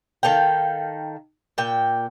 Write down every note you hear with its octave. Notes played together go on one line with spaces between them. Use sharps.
D#3 A4 F5 G5
A#2 G5